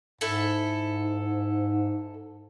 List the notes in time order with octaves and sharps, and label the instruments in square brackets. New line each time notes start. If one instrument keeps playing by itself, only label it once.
[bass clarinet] G#2 [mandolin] E4 A4